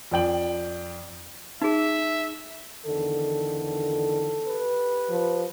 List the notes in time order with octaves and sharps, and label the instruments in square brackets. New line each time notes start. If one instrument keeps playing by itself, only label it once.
[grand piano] F2 D5 G5 F#7
[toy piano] D#4 G#4 [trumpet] E5
[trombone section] E2 D3 D#3 [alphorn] A4
[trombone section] G4 B4
[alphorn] F3